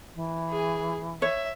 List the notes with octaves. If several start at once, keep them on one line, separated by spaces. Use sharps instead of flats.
E3
G#4
C#5 E5